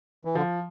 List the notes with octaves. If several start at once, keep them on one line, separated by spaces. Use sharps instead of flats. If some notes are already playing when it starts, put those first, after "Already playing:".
E3
D3 F3